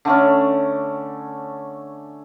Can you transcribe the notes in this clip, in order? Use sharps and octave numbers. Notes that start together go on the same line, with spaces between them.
D3 A3 C#4